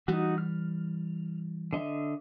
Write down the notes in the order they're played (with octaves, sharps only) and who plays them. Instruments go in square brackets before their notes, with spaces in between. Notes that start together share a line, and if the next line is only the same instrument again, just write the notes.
[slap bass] E3 G3 [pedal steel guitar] D#4 F#4
[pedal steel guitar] F6
D3 D#5 E5